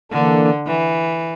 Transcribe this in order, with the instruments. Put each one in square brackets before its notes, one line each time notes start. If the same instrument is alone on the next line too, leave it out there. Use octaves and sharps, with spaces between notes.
[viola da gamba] D3 [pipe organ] E3 A#3 D4 A4
[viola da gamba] E3